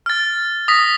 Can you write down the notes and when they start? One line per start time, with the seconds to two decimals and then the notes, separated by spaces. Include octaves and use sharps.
0.06 F6 A6
0.68 D#6 A#6 B6